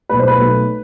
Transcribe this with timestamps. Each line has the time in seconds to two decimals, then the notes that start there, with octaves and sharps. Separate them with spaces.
0.09 B1 B2 A3 B4
0.19 C5
0.28 B4
0.38 B1 B2 A3